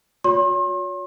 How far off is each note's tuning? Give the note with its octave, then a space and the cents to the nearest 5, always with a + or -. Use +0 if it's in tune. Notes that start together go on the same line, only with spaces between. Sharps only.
F#4 -45 C#5 +30 C6 +40